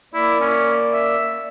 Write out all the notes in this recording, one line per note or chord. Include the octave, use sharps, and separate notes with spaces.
A#3 E4 D5
C#4
E5